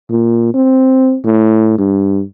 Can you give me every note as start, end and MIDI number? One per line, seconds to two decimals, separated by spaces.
0.10 0.54 46
0.54 1.17 60
1.25 1.74 45
1.78 2.22 43